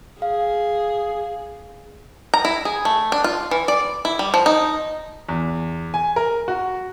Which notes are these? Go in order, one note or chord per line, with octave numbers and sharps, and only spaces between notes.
G#4 F5
A#5
E4
G#4
A3
D4
F4
E3
D5
E4
G3
F3
D#4
E2
G#5
A#4
F#4